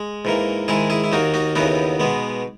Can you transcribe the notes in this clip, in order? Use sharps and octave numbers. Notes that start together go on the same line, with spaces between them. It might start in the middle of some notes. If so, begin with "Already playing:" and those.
Already playing: G#3
G#2 E3 A#3
G#2 D#3 G#3 E4 G#4
E4 G#4
E4
D#2 D#3 A#3 D#4 F#4
D#4 F#4
D#2 C#3 E3 B3 D#4 F#4
B2 G#3 B3